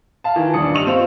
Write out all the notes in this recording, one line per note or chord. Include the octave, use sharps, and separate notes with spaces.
F5 A5
D#3 E3
D#1 D4 D#6 C#7
G2 D#5 C#6 E6 F7
C4 F4